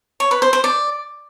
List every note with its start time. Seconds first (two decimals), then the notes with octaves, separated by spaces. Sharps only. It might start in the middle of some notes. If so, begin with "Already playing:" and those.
0.20 C#5
0.31 B4
0.42 C5
0.53 C5
0.64 D5